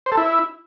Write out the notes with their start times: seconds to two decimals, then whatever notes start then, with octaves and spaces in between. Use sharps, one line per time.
0.06 C5
0.12 A4
0.17 E4